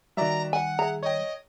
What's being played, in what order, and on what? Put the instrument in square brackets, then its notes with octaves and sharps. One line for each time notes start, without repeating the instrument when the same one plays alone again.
[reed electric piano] D#3 G3 [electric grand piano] F#4 D5 E5 [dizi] A#5
[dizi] F#5 [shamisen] G#5
[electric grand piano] G#4 E5 [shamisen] A#5
[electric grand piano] C#5 G5 [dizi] D#5